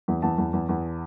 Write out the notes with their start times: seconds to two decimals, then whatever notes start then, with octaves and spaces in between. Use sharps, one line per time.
0.08 E2
0.22 E2 A5
0.38 E2
0.53 E2
0.69 E2